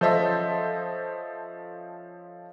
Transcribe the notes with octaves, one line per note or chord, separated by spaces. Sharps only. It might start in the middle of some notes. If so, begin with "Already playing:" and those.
F3 C#4 A4 C5 D#5 E5